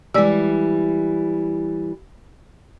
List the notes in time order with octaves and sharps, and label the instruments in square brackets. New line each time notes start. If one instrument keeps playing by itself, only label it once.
[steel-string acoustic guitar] E3 G3 [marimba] G#3 D5 E6